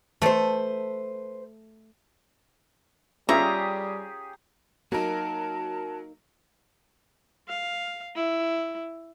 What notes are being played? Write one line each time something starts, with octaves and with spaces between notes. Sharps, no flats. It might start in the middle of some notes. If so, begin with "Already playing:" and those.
A3 A4 B4 C5
G3 C#4 F4 G4 G#4 E5 A#5
F#3 A#3 D#4 A#4 A5
F5
E4